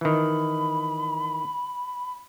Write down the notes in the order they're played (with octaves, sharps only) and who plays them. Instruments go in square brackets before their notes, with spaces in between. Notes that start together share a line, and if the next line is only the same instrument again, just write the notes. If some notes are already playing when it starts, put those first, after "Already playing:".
[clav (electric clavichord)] D#3 E3 [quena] B5